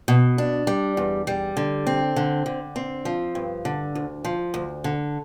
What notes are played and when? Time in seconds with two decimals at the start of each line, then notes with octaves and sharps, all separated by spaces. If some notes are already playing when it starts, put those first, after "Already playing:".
0.08 B2
0.38 D4
0.67 G3
0.97 E2
1.27 G3
1.57 D3
1.87 C4
2.16 D3
2.46 D3
2.76 C4
3.05 F3
3.35 G2
3.65 D3
3.95 D2
4.25 F3
4.54 D2
4.84 D3